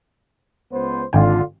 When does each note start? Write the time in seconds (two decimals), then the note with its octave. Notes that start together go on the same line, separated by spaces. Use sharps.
0.72 C#2 B3 C5
1.13 G#1 D3 F4 G5 G#5